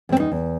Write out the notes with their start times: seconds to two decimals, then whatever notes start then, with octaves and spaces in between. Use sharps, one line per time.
0.09 E2 C4
0.20 D#4
0.31 E2